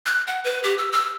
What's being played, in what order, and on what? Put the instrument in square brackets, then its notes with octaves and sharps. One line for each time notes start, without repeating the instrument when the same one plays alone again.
[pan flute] F#6
F#5
B4
G4
E6
E6